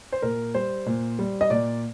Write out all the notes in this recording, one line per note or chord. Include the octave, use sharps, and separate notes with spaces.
C5
A#2 A#4
G3 C5
A#2
G3
D#5
A#2 D5